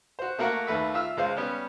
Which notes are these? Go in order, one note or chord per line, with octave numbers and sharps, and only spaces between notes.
F#4 C5
A3 A#3 F#4 A#4 F5
D#2 A3 B4 E5
F4 E5 E6 F6
C#2 G#3 C5 F5
G3 B3 C#4